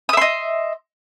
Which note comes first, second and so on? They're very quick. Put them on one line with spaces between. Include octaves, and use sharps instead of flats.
D#6 E5 C6 D#5